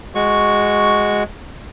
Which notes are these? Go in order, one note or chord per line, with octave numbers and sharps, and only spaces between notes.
G#3 F#4 C#6